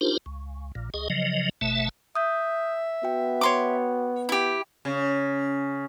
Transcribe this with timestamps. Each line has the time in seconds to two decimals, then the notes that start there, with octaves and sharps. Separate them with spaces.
0.01 D4 D#4 F4 G4 A#4 C5
0.26 C#2
0.75 A#1 A#2
0.94 C#2 G#4 D#5
1.10 C#3 F3 F#3 D#5
1.61 F#1 B2 A3 E5 A5
2.15 E5 D#6 G6
3.03 B3 F#4 G5
3.41 C#5 C6 D6
4.29 E4 G4
4.85 C#3